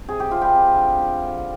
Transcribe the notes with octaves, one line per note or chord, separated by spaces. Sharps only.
C3 G#4
G4
C3 F4
G3 G4
C3
D3
D3
D3